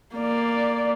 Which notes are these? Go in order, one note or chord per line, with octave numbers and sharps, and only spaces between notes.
A#3 D5